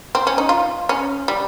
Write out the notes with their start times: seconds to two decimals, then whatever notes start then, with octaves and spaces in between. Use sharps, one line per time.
0.15 C4
0.27 C#4
0.38 D#4
0.49 F4
0.89 C#4
1.28 G3